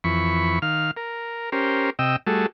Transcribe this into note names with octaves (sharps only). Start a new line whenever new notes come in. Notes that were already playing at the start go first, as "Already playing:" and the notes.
F2 E3 B5 C#6
D#3 F5 F6
A#4
C#4 G4 A#4 C5
C3 D#5 G5 E6
G3 A3 F#4 G#4 A4